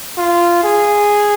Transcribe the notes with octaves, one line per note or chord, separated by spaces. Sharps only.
F4
G#4